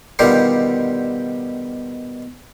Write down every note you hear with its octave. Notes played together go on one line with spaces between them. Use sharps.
B2 D3 D#3 G3 F4 G4